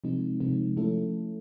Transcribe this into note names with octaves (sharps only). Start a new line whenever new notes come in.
C3 F3 G#3 C4 D#4
C3 F3 G#3 C4 D#4
F3 A3 C#4 E4 A4